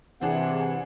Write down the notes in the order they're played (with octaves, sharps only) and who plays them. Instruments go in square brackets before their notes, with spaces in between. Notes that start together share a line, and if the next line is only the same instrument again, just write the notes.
[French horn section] C3 E3 [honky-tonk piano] C4 D4 G#4 [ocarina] F#5